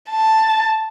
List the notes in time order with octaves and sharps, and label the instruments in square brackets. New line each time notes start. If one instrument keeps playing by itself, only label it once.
[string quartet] A5